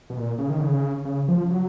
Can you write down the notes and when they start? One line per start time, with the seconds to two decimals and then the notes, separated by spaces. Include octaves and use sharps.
0.10 B2
0.17 A#2
0.38 C#3
0.50 D#3
0.61 C#3
1.05 C#3
1.28 F3
1.51 F#3